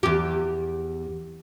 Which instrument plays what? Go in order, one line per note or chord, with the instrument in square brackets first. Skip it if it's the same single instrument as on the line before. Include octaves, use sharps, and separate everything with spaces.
[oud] E2 G4